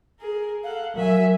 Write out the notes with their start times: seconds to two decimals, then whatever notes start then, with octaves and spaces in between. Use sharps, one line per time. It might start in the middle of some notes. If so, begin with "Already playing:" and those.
0.20 G#4 A#4
0.64 A4 F5 F#5
0.96 F#3 A#4 E5 G#5